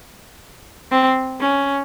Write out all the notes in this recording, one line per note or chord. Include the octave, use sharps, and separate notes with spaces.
C4
C#4